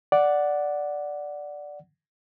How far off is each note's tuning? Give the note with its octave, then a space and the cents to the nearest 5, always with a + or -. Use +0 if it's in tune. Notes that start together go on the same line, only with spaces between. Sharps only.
D5 +0 F#5 +0